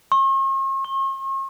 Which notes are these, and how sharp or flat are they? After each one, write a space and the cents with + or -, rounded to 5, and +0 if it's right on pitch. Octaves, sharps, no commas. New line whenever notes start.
C#6 -45
C#6 -40